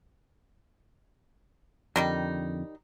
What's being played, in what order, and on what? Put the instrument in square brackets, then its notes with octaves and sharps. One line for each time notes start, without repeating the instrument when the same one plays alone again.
[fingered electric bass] F2 D3 [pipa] D#3 G3 D#4